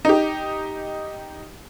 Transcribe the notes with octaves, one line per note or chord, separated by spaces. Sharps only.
D#4 G4